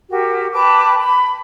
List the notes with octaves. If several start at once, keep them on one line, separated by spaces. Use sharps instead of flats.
F#4 G4 A#4
B4 G5 A5 D6
B5